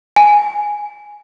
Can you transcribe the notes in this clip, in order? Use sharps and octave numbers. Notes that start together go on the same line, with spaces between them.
G#5